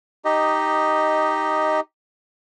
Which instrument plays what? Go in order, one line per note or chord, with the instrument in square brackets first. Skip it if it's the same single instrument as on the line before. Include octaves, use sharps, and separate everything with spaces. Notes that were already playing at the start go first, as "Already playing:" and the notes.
[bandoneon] D#4 G4 D#5